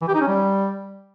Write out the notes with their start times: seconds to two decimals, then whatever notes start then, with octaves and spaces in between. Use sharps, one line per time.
0.01 E3
0.08 G4
0.14 D#4
0.21 C#4
0.27 G3